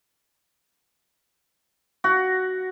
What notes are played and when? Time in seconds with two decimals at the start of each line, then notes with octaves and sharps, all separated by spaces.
2.04 F#4